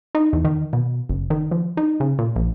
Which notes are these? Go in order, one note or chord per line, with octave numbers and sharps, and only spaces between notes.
D#4
E2
D#3
B2
F#1
D#3
F3
D#4
C#3
A#2
A#1